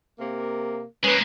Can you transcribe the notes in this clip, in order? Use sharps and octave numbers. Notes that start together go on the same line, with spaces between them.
C3 A#3
G#3 A#3 C#4 B4